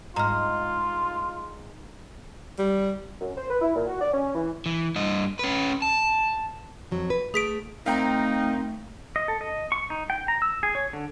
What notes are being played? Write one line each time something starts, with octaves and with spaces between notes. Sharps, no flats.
G#2 F4 A#5 F6
G3
F#2
C5
B4
E4
A#2
F#4
D5
C#4
E3
E3
G2 D#5
C#4 B4
A5
F2 F#3
B4
A3 G#4 B6 D7
A3 C4 D#4 A#4 F5 G5 A#5
D#5
A4
D#5
C#6
D#4
G5
A#5
E6
G#4
C#5
D3